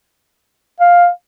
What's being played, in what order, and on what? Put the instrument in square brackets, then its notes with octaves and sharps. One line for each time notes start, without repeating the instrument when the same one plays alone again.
[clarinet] F5